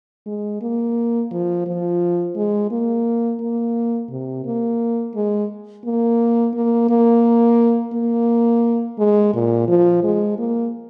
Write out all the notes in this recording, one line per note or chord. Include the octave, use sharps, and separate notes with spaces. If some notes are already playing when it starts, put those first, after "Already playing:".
G#3
A#3
F3
F3
G#3
A#3
A#3
C3
A#3
G#3
A#3
A#3
A#3
A#3
G#3
A#2
F3
G#3
A#3